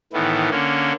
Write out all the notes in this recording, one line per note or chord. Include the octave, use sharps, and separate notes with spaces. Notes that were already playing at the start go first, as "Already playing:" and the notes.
A2 D#3 E3 B3
D3 A#3 C#4